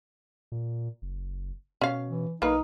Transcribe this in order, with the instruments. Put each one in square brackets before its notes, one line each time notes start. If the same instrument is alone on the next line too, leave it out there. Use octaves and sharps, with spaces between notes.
[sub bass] A#2
F#1
[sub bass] B2 [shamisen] C#4 F5
[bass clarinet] E3
[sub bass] B1 [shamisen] A#3 B4 [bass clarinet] D#4